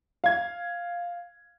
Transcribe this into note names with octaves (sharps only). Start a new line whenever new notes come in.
F5 G#6